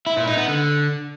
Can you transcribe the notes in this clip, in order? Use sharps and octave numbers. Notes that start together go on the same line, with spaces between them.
E4
A#2
D#4
B3
D3